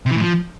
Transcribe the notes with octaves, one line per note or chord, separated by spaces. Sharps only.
C3
E3
A2
F3